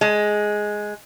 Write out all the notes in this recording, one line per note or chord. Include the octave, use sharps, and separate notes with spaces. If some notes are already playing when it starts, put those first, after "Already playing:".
G#3